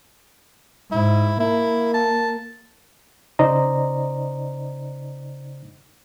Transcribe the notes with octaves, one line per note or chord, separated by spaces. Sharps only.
G#2 E4
A#3 E4
A5
C#3 D#4 C5 D5 D#5 A#5